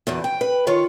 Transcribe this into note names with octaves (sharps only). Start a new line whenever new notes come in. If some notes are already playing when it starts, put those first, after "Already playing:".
E2 B2 D3
G5
B4
D#3 F4 C#5